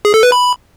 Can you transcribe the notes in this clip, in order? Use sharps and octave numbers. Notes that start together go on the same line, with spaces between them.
G#4
A4
B4
B5